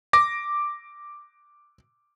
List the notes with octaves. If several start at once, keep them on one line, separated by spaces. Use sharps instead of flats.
D6 A#6